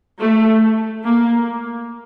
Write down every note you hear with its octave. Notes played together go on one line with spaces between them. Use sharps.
A3
A#3